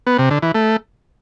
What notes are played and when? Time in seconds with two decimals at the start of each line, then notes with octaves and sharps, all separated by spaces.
0.07 B3
0.19 C3
0.31 D3
0.42 E3
0.54 A3